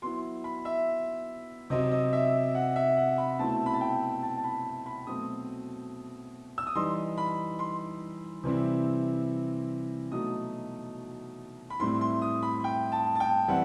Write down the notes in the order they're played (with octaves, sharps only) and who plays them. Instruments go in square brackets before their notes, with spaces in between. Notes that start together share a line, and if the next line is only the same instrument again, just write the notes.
[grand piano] F#3 B3 E4 C6
B5
E5
C3 F#3 C4 D#5
D#5
E5
F#5
E5
F#5
B5
B2 A3 C4 E4 A5
B5
A5
G5
A5
A5
B5
B5
B2 F#3 A3 C4 D#6
E6
D#6
E3 G3 D#4 C6
B5
C6
C3 E3 G3 C4 E4
B2 F#3 A3 D#4 D#6
B5
A2 G3 C4 E4 C6
C6
D#6
B5
G5
A5
A5
G5
E3 G3 C4 E4 F#5